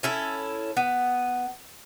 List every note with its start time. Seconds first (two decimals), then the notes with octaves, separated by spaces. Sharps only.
0.03 C#4 E4 A4
0.77 B3